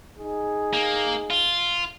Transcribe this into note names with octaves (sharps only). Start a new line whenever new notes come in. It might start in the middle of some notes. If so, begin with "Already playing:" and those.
D#4 G#4
A#3
F4